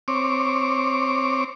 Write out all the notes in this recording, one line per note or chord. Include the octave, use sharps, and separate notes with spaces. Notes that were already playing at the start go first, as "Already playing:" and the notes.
C4 C#5 D6